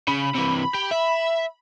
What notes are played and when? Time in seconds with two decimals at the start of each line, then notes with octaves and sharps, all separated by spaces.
0.08 C#3 B5
0.35 C3 E3
0.75 G4
0.92 E5